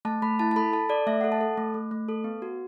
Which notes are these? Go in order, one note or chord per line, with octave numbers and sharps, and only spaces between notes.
A3 A5
A3 B5
E4 A5
A5
A4 B5
A4 A5
A4 D5
A3 E5
A4 F#5
A5
A4
A3
A3
A3
A4
B3
F#4